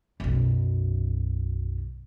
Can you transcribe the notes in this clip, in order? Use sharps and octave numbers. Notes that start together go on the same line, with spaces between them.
B1 F#2